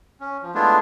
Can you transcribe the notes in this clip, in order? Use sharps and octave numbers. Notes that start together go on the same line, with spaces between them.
C#4
F3
G#3 A3 B3 D4 E4 F4